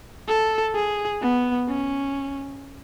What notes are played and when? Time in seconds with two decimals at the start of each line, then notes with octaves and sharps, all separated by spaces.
0.28 A4
0.75 G#4
1.22 B3
1.68 C#4